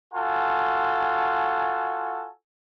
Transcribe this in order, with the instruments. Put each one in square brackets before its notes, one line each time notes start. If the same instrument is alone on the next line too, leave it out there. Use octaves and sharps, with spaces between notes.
[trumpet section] F4 F#4 A4 G#5